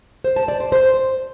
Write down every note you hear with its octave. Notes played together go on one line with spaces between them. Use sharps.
C5
A5
D5
C5
C5